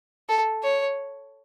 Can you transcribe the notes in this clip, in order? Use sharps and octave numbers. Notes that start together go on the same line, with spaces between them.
A4
C#5